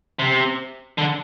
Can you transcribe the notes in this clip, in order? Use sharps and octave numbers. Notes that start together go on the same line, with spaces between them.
C3
D3